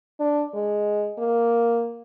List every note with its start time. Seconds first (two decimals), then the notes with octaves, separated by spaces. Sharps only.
0.20 D4
0.54 G#3
1.18 A#3